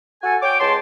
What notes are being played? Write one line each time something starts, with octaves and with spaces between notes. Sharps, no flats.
F#4 A4 G#5
C#5 G5 D6
C#2 C#5 A5 C6